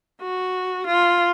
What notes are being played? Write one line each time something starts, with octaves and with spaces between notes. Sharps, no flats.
F#4
F4